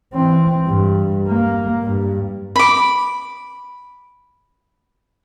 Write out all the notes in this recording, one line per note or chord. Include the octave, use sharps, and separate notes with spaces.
E3 C4
G2
A#3
G2
B5 D6